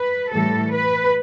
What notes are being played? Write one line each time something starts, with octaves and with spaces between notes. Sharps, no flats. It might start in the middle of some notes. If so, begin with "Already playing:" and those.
Already playing: B4
A2 E3 G3 A4
B4